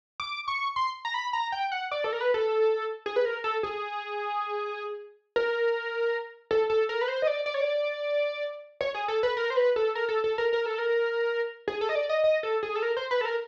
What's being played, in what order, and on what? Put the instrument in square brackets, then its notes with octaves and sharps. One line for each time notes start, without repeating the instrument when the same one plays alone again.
[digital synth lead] D6
C#6
C6
A#5
B5
A#5
G5
F#5
D5
A4
A#4
B4
A4
G#4
B4
A#4
A4
G#4
A#4
A4
A4
A#4
B4
C5
D#5
D5
D5
C#5
D5
C#5
G#4
A4
B4
A#4
C5
B4
A4
A#4
A4
A4
A#4
A#4
A4
A#4
G#4
A4
D#5
D5
D#5
D#5
A4
G#4
A4
A#4
C5
B4
A4
A#4